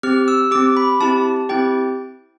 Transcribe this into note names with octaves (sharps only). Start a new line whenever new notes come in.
C4 G4 F6
E6
C4 G4 D6
B5
C4 E4 G4 A5
C4 E4 G4 G5